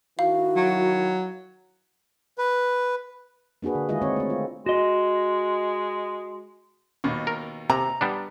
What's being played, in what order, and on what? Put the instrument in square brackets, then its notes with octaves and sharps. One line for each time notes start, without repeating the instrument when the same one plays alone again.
[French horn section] D#3 E4 [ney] F#4 [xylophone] F5
[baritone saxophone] F#3
[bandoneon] B4
[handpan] A#3 D4 F#4 G#4 B4
D3
D#3 G#3 E4 F4 G#4 D#5
C4 D#4 F4 C#5 D5
A3 C4
F4
[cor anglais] G#3 [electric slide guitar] F#4 D#5
[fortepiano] D#2 B2
[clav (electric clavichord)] A#4
[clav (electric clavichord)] C3 [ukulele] A#5
[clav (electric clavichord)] G3 B3 D4